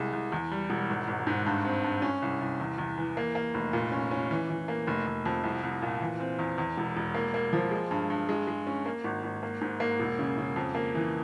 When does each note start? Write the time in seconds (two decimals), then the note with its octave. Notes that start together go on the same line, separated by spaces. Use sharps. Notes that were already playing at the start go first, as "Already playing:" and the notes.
Already playing: C2 G#3
0.13 C2
0.32 E2
0.51 G3
0.70 E1
0.89 G#1
1.08 G#1
1.27 G#2
1.46 G2
1.65 C4
1.84 G2
2.02 C#4
2.22 C2
2.41 C2
2.60 E2
2.78 E2
2.98 E3
3.17 A#3
3.35 A#3
3.54 F1
3.73 A#2
3.92 C#4
4.11 C#4
4.31 E3
4.50 E3
4.68 A#3
4.87 F1
5.07 F1
5.25 F2
5.43 C2
5.63 C2
5.82 A#2
6.01 E3
6.20 C4
6.39 E2
6.58 E2
6.77 E1
6.96 E1
7.15 A#3
7.34 A#3
7.53 F3
7.71 G#3
7.91 G2
8.10 G2
8.29 G#3
8.47 G#3
8.67 C#4
8.86 A#3
9.04 G#1
9.24 G#1
9.43 A#3
9.61 G#2
9.80 A#3
10.00 E1
10.19 C#3
10.38 C#3
10.56 F2
10.75 A#3
10.95 E3